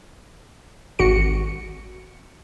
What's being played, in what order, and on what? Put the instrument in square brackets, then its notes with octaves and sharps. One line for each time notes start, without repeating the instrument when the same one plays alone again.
[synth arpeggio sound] G#1 F#4 C#7